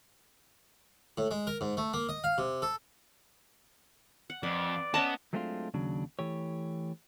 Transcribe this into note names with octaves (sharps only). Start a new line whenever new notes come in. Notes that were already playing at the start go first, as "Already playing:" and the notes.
A2
G#3
A#4
G#2
A3
A#3
D#5
F5
C3
A4
F#5
F2 B4 D5
B3 C#4 D#5 F#5 A5
F#3 G#3 A3 C4 D4 F4
D#2 C#3 F#3 D4
E3 A3 G4 C#5